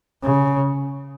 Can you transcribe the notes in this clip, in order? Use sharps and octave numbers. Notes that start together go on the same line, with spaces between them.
C#3